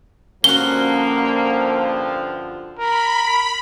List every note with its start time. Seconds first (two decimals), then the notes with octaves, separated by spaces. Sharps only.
0.44 G2 D3 F3 A#3 C#4 F#4 G7
2.79 A#4 B5